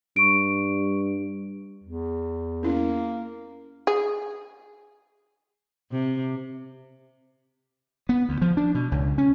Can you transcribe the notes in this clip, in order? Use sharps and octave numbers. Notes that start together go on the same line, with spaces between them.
G2 C#6 D7
E2
A#3 C#4 E4
G#4
C3
B3
D2
F3
D4
B2
C#2
C#4